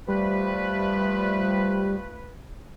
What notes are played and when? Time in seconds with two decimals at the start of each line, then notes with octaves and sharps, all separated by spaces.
0.08 F3 G3 A3 B4